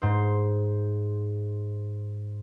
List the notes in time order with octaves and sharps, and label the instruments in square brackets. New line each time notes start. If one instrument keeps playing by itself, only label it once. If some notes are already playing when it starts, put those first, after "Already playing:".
[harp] G#2 C5